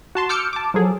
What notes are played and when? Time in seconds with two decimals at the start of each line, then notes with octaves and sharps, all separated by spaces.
0.15 F#4 A5 C6
0.29 D6 E6 F6 G6 C#7
0.53 A5 D6
0.74 F3 F#3 G#4 A4